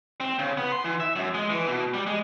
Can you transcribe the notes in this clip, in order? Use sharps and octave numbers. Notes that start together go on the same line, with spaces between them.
C4
C#3
B3
C6
E3
E5
F#2
G#3
E3
B2
G3
G#3